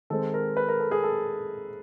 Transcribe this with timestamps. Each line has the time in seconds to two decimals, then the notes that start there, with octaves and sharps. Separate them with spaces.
0.10 D#3 G#3 C4 A4
0.34 A#4
0.57 B4
0.69 A#4
0.80 A4
0.91 G#4
1.03 A4